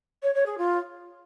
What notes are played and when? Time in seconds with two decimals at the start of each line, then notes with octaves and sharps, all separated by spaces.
0.22 C#5
0.34 C#5
0.46 G#4
0.57 F4